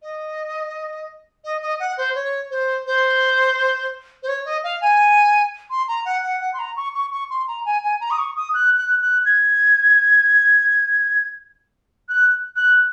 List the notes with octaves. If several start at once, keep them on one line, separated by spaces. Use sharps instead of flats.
D#5
D#5
D#5
F#5
C5
C#5
C5
C5
C5
C#5
D#5
F5
G#5
C6
A#5
F#5
F#5
F#5
C6
A#5
C#6
C#6
C#6
C6
A#5
G#5
G#5
A#5
D#6
C#6
D#6
F#6
F#6
F#6
G#6
F#6
F#6